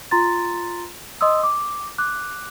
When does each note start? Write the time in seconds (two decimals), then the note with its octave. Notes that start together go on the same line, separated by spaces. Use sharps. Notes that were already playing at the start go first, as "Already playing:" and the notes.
0.11 F4 A#5 C6 A6
1.21 D#5 C6 D#6 E6
1.43 D6
1.98 D6 F#6